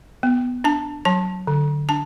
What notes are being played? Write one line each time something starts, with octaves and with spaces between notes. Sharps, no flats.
B3
D4 A5
F#3 A5
D3
D4 A5